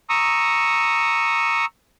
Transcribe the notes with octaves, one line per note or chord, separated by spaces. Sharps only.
A#5 C#6 D#6 E6